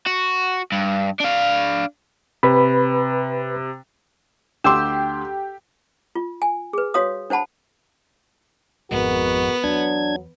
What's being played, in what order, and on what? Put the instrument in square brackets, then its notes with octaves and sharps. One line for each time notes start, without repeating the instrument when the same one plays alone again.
[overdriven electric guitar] F#4
G2
D4 F5
[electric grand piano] C3 [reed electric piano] B4 B5
[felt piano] D2 C6 [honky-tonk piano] G4 [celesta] D6 E6 E7
[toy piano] F4
G#5
G#4 B4
F#4 C#5 F5 D#6
D4 C5 F#5 A5 B5
[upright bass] G#1 F2 [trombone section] G#3 F#4 A#4 [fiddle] B3
[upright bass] E2 [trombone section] F#3 [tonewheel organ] D4 G#6